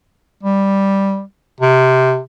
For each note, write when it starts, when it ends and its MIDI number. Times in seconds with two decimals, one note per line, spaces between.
0.43 1.21 55
1.61 2.18 48